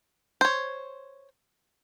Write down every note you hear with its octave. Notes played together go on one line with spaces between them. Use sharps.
C5 C#5